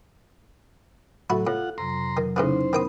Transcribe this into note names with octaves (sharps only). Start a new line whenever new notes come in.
A2 F#3 E4 F#4 A4
A2 F4 F#5
F2 C3 F#3 A#5 C6
D#3 F#3
A2 C#3 E3 C#4 D#4 E4 C5
D#3 B3 G5 B5 D#6